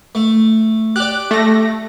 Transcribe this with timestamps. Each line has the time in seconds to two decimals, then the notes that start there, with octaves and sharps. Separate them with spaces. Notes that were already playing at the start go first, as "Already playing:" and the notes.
0.15 A3
0.96 G4 D5 F#6
1.31 A3 A#6